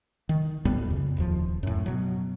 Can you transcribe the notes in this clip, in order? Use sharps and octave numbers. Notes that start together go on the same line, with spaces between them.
D#3
D2 A2 G3 B3
F2 C#3
D1 D#2 F3
F#2 A2
B2 F#3